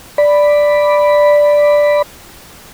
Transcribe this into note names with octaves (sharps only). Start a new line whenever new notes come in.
D5 B5